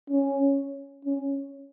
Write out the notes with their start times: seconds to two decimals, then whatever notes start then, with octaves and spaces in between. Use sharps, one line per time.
0.10 C#4
1.05 C#4